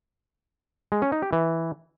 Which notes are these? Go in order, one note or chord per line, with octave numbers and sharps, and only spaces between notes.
G#3
C#4
D#4
G4
E3